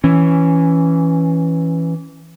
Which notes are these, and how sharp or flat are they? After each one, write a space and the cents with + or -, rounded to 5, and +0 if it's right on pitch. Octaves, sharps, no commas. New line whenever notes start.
E3 +0 C#4 +0